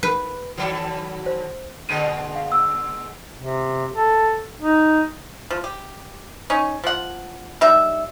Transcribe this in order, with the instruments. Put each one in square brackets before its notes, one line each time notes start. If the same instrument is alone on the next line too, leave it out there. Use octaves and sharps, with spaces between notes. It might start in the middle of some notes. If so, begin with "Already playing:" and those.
[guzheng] B4
[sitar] D#3 F#3 A4
[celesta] C5
[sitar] A#2 D3 G#3 [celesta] D#7
[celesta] F5
E6
[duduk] C3
A4
D#4
[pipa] F3
G4
C#4 D#4
F3 F#5
G3 D#4 E5